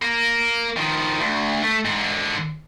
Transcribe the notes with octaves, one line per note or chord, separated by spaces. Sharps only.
A#3
D#3 F3
D2
A3
G#2 D3